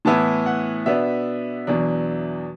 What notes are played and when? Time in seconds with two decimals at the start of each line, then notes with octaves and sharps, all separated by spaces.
0.05 A2 E3 B3 E4 A5
0.46 F#5
0.86 B2 B3 D4 E5
1.67 E2 B2 F#3 D4